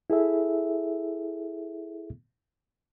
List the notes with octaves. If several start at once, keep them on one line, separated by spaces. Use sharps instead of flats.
E4 G#4 A4 E5